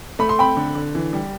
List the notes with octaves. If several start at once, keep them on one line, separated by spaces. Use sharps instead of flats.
A3 B5
C6
C4 G5 B5
D3
D3
E3
G3